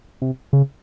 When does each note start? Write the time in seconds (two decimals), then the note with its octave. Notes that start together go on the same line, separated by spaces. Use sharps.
0.22 C3
0.53 C#3